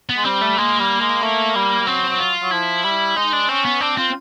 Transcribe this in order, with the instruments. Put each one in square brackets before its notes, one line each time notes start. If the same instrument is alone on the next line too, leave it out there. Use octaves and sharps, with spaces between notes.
[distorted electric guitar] B3
[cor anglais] G#3
[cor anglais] G3 [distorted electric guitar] C4
[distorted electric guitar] A3
[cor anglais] G#3 [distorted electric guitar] A#3
[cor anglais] G3
G#3
A3
G3
G3
[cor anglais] F#3 [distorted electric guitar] C4
[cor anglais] F#3
[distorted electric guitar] F4
[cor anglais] F#3
[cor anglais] F3 [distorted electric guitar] E4
[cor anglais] G3
[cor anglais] G#3 [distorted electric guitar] D#4
[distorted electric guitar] D4
[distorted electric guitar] C4 [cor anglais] C#4
[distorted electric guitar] B3
[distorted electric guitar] C4 [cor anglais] D4
[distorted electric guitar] C4 [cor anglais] F4